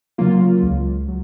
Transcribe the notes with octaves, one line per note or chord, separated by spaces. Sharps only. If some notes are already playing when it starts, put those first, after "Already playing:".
C#3 F#3 A#3 F4
C#2
F#3